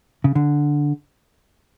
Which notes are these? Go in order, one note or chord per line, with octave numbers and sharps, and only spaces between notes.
C#3
D3